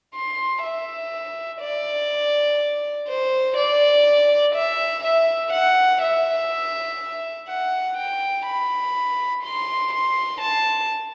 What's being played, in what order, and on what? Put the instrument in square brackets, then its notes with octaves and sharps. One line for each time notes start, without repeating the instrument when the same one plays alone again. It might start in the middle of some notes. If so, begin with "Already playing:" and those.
[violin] C6
E5
D5
C5
D5
E5
E5
F#5
E5
F#5
G5
B5
C6
C6
A5